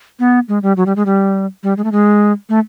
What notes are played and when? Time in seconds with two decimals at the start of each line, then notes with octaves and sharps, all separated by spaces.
0.20 B3
0.48 G#3
0.63 G3
0.77 F#3
0.86 G3
0.96 G#3
1.06 G3
1.63 G3
1.77 G#3
1.84 A3
1.92 G#3
2.49 A3